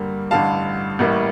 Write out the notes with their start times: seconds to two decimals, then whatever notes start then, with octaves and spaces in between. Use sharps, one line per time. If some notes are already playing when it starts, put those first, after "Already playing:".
Already playing: G2 D3 G3 A#3
0.31 A1 G2 D3 G3 F5 A5
0.99 A1 A2 G3 A#3